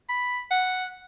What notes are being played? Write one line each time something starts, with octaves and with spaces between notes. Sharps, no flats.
B5
F#5